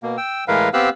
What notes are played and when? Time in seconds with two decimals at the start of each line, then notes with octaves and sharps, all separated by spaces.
0.03 B2 A#3
0.17 G5 E6
0.48 A2 E3 G#3 A#4 B4 F5
0.74 B3 C4 G4 F5 E6 F#6